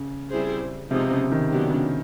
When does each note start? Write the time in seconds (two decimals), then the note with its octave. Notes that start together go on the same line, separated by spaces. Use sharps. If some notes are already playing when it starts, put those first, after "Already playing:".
Already playing: C#3
0.31 G3 C4 E4 G#4 C5
0.90 C3 F3 G#3 B3 D#4 G#4
1.11 C#3
1.32 D#3
1.51 F#3 B3 D4 G4
1.71 C#3